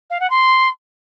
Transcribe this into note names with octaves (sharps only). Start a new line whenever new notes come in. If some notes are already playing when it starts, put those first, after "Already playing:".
F5
F#5
C6